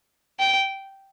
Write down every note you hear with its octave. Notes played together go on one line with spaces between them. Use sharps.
G5